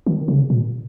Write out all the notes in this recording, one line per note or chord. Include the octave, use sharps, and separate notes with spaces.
D#3
C#3
A#2